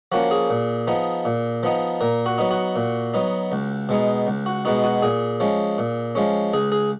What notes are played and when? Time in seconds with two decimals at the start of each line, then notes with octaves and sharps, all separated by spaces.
0.12 F3 A#3 C#4 F#4
0.31 G#4
0.50 A#2
0.87 F3 B3 D#4
1.25 A#2
1.63 F3 B3 D#4
2.01 A#2 A#4
2.26 F#4
2.38 F#3 B3 D#4
2.51 F#4
2.75 A#2
3.14 F#3 B3 D#4
3.52 C#2
3.89 B2 G#3 B3 D#4
4.27 C#2
4.46 F#4
4.65 B2 G#3 B3 D#4 F#4
4.84 F#4
5.02 A#2 G#4
5.40 F3 G#3 C#4
5.78 A#2
6.15 F3 G#3 C#4
6.53 C#2 G#4
6.72 G#4